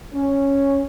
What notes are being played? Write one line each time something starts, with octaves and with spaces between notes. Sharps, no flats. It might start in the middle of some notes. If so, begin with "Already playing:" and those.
C#4